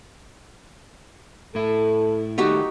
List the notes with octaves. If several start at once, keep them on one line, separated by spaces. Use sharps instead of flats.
A2 E4 A4
D#3 G3 A3 D#4 F#4 G4